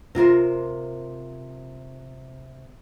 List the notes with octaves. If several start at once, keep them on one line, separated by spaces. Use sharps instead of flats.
C3 F4 A#4 C5